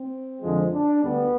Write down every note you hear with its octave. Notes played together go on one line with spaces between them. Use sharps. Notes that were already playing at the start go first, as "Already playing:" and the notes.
Already playing: C4
F2 D3 F3 G#3
D4
D2 D3 G3 B3